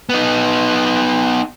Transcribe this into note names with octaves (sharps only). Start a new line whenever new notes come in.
B3 D#4